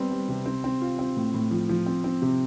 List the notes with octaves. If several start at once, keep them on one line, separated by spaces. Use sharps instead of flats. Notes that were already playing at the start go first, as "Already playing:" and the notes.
Already playing: G3 B3 C4
G3
C3
C4
C4
F4
C4
A2
A2
F3
F3
C4
C4
C3